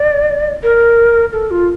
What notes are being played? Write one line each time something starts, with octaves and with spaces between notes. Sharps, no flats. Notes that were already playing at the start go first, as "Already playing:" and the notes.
Already playing: D5
A#4
A4
F4